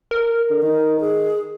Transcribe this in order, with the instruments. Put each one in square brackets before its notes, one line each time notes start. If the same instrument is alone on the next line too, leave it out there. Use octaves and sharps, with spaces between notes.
[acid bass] A#4
[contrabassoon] D3
[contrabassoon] D#3 [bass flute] D#4
[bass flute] G#4